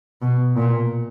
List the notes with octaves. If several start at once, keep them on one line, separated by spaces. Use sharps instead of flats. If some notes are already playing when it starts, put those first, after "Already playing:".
B2
A#2